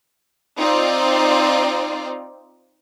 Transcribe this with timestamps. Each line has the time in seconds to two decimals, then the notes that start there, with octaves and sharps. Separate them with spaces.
0.57 C4 D#4 F4 D5